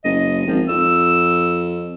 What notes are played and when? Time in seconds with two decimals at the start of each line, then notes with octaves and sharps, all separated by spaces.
0.05 F#1 D#5
0.47 G#1 F3
0.69 F2 E6